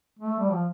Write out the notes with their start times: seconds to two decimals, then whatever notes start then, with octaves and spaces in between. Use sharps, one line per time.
0.19 A3
0.39 G3
0.51 F3